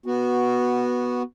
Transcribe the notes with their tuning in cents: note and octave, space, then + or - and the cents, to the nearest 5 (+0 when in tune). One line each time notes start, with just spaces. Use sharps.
B3 -10 F#4 +0